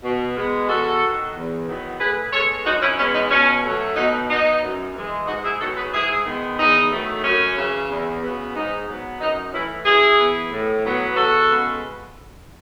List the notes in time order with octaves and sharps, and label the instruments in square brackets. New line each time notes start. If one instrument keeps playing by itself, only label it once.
[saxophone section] B2
G#3 B3
E2 F#4 A4
D#3 F#3
E2
D#3 F#3 B3
A2 G#4 B4
G#3 B3 A4 C#5
F#2 D#4 F#4
C#4 E4
E3 G#3 B3 C#4
D#4
B2 C#4
F#3 A3
B2 D#4
F#3 B3 D#4
F#2
E3 G#3
G#2 D#4 F#4
E4 G#4
D#3 F#3 B3 F#4 A4
G#4 B4
G#2 E4 G#4
D#3 G#3 B3
E2 D#4
D#3 F#3 A3
F#2 C#4
C#3 E3
E2
C#3 F#3 B3
G#2 D#4
F#3 B3
F#2 D#4
E3 A3 C#4 E4
F#2 E4 G#4
E3 B3
A2
F#3 B3
E2 F#4 A4
C#3 G#3 B3